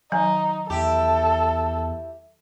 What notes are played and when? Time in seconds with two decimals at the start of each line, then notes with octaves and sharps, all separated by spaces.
0.12 D#3 F#3 D#4 G#5
0.70 E2 E4 G4 A4